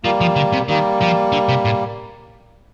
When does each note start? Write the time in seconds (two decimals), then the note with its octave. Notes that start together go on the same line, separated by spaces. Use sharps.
0.04 F3 G3 A#3
0.21 F3
0.36 D3
0.53 C3
0.68 D#3 G3 A#3
1.01 F3
1.32 D3
1.48 C3
1.65 A2